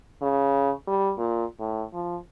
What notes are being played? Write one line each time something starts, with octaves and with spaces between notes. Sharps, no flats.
C#3
G3
A#2
A2
F3